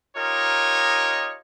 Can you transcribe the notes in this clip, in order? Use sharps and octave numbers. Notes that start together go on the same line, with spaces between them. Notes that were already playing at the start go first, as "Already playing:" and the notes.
D#4 F4 G4 A#4 C#5 D#5